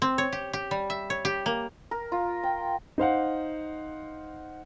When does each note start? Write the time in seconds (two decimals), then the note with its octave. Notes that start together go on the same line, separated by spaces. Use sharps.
0.02 C4
0.18 C#5
0.32 G4
0.53 G4
0.71 G3
0.90 E5
1.10 C#5
1.25 G4
1.46 A#3
1.91 A#4
2.12 F4
2.43 G5
2.98 D#4 C5 F5 F#5